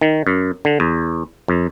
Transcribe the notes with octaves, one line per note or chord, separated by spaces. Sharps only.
D#3
F#2
D3
E2
F2